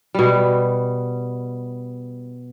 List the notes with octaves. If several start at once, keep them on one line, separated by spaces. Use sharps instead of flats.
B2 G3